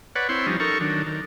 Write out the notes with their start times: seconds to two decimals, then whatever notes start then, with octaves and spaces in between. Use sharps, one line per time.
0.16 B4 C#5 D5 F#5
0.29 C4 E4 C#5 C6
0.47 F3 G3 C#4 D#4
0.60 D#4 A4 A#4 C#6
0.81 D#3 F#3 D4
1.06 D#3